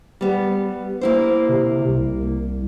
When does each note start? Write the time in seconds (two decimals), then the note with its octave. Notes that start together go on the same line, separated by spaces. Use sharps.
0.21 G3 B3
1.01 A#3 E4 C5
1.49 C3
1.88 C2